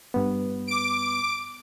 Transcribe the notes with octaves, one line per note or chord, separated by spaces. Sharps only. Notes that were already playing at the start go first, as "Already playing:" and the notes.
G2 B3
D6 D7